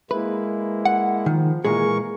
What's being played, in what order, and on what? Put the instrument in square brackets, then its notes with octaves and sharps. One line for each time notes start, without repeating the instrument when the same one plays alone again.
[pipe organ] G#3 A#3 E4 [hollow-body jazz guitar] B4
[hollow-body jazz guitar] F#5
[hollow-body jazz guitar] D#3 [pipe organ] F3
[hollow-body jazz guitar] A#2 G#3 G#4 [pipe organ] E3 A#4 C#6